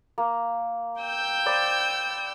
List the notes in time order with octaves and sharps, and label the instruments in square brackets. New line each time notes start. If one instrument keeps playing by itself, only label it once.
[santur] A#3
[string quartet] G5 E6 G6
[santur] C5 D5 B5